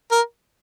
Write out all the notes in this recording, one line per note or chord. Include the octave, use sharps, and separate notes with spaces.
A#4